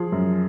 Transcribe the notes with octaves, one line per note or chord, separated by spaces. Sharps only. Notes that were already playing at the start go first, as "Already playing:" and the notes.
Already playing: F3 G#4
F#2